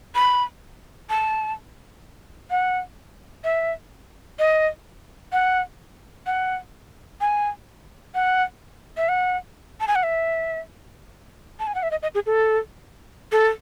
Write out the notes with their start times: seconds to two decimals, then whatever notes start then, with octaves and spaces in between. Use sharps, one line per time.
0.15 B5
1.10 A5
2.50 F#5
3.44 E5
4.39 D#5
5.32 F#5
6.26 F#5
7.21 G#5
8.15 F#5
8.97 E5
9.09 F#5
9.80 A5
9.88 G#5
9.95 F#5
10.03 E5
11.60 A5
11.67 G#5
11.75 F#5
11.83 E5
11.91 D#5
12.02 D#5
12.15 G#4
12.26 A4
13.32 A4